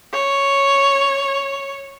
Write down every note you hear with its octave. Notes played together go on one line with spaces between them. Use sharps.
C#5